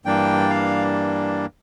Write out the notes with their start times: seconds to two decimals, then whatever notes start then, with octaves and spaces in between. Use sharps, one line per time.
0.05 G2 E3 G3 A#3 D4 G5
0.50 F5